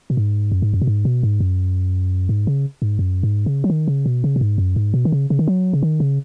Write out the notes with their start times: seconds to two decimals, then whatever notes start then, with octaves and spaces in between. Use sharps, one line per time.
0.10 B2
0.17 G#2
0.52 F#2
0.62 G#2
0.73 F#2
0.82 B2
0.87 G#2
1.05 B2
1.23 G#2
1.40 F#2
2.29 G#2
2.47 C#3
2.82 G#2
2.99 F#2
3.23 G#2
3.46 C#3
3.64 F#3
3.70 D#3
3.88 C#3
4.06 B2
4.24 C#3
4.36 B2
4.41 G#2
4.58 F#2
4.76 G#2
4.94 B2
5.05 D#3
5.12 C#3
5.30 C#3
5.39 D#3
5.48 F#3
5.73 C#3
5.83 D#3
6.00 C#3